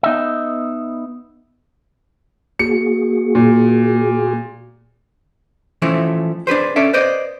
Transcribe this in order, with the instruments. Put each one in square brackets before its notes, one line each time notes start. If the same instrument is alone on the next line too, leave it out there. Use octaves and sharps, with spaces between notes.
[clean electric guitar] B3 D#4 D#5 E5
[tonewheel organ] A#3 F#4 G#4 [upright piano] C#7
[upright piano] A#2
[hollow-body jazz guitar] E3 F3 A3 C#4 E4
D4 G#4 B4 C5
C#4 A4 D5 E5
B4 C5 D5 D#5